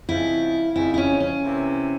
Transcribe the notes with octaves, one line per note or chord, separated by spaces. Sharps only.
C#3 F3 G#3 C4 E4
C#3 F3 G#3 C4 E4
E4
C#4
C#4
C3 E3 A#3 E4